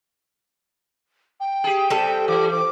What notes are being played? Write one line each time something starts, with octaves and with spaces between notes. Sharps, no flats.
G5
G4 G#4
C3 G3 A4
E3 D6
D6